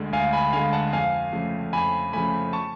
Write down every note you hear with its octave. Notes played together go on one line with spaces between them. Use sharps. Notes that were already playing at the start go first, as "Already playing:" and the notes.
Already playing: D2 D3 G#3
D2 F5 G#5
G#5 B5
D3 G#3 F5 G#5
F#5 A5
F2 F5 G#5
C#3 F3 A3
F2 G#5 B5
C#3 F3 A3 G#5 B5
A5 C#6